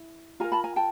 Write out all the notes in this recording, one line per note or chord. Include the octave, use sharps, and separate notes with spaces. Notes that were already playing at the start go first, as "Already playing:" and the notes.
Already playing: E4
F4 A#4 G#5 A#5
A5 B5
G#5 A#5
G5 A5